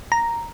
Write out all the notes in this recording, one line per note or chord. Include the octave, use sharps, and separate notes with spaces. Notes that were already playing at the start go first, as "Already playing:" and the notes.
A#5